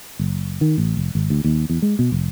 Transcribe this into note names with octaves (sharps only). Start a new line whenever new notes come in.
F#1
D#3
A1
F1
G#1
D2
D#2
E2
G#3
B2
F1